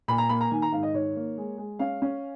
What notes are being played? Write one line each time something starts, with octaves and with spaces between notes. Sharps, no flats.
A#2 B5
A#5
A#3 B5
A#5
D#3 G#5
A#5
G#2 F5
D#5
D#3 C#5
A#3
G#3
G#3
C#4 F5
C#4